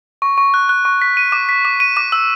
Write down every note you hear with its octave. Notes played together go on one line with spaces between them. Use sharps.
C#6
C#6
F#6
F#6
C#6
B6
D#7
D6
B6
D6
D#7
D6
E6